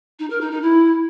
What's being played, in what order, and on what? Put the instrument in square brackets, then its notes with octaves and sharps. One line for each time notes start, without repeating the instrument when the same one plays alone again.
[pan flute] D#4
A#4
D#4
D#4
E4